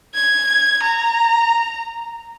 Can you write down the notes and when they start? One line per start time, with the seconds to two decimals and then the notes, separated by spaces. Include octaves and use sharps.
0.14 G#6
0.83 A#5